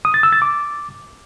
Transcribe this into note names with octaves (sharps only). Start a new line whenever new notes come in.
D#6
A6
E6
A6
D6